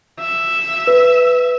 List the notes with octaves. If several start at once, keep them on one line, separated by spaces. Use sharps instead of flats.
E5
B4